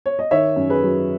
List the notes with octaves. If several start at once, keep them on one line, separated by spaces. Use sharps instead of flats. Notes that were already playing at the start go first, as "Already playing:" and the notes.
C#5
D#5
D#3 C#5 E5
F#2
G#4 B4
F#3